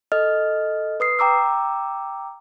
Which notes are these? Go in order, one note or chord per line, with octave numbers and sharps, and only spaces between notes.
A4 D#5 F6
B4 D#6 C7
G5 A#5 D6 E6